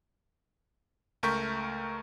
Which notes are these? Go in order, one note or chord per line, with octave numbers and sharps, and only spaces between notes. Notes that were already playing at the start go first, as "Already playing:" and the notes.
C#2 A3 A#4 C#6 G6 B6